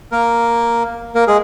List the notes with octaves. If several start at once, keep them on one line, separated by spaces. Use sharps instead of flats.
A#3 A#4
A#3 A#4
G#3 G#4